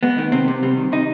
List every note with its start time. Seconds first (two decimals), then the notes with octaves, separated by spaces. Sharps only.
0.03 G#3 B3
0.18 D#3
0.32 C3 C4
0.48 C3
0.63 G3 C4
0.77 D#3
0.92 C3 D#4